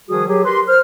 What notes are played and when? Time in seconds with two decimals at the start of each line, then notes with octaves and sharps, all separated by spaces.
0.09 D#3 F3 G3 F#4 G#4 D#6
0.27 F#3 G4 G#4
0.44 G4 A#4 B4 C6
0.67 C5 F6